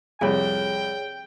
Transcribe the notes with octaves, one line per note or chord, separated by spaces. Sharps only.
C2 F2 G#4 C#5 G5